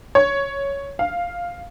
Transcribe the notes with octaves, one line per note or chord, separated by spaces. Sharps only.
C#5
F5